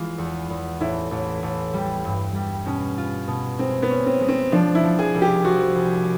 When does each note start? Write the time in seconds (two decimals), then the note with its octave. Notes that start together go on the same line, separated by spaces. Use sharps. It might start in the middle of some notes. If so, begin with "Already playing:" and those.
Already playing: E3 G#3 F4
0.18 E2
0.50 E2
0.80 A1 E4
1.11 A1
1.43 A1
1.74 G3
2.05 G2
2.35 G3
2.66 B2 C#4
2.98 F4
3.28 B2
3.59 G#3 C4
3.82 B3
3.91 C#4
4.06 C4
4.20 G#3
4.28 C4
4.52 F3 D4
4.75 E4
4.83 F3
4.99 G#4
5.14 C2
5.22 G4
5.44 F3 F#4
5.75 C2